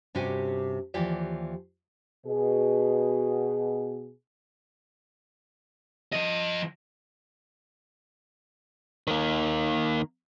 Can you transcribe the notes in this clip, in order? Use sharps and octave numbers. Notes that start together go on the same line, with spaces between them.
G2 C3 C#4 F#4 G4 G#5
D#2 E3 F3 G4 D5
B2 G#4
F3 D#5
D#3 A#3